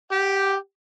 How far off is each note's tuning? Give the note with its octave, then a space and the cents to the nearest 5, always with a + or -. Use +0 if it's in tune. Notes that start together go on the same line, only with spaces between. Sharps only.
G4 +0 F#5 +35